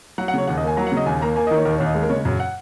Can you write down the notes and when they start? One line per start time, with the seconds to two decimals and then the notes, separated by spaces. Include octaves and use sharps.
0.18 F#3 F#5
0.28 F#5
0.34 C#3 C#5
0.47 D#2 F#5
0.57 D#5
0.63 A#3 G#5
0.77 F#3 A#5
0.87 F#5
0.92 C#3
0.97 D#5
1.06 D#2 G#5
1.21 A#3 A#5
1.36 A#3 G#5
1.47 D#5
1.51 D#3
1.56 C#5
1.65 D#2 A#4
1.76 C#5
1.80 D#2
1.86 D#5
1.95 G#3
2.03 A#4
2.10 C#3 C#5
2.25 F#2
2.40 F#5